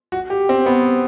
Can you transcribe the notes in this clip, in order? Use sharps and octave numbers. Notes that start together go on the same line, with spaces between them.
F#4
G4
C4
B3